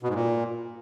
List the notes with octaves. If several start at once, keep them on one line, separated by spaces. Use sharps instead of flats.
B2
G#2
A#2